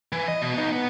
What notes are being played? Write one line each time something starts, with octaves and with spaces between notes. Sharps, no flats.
E3
D#5
B2
B3 D#4
B3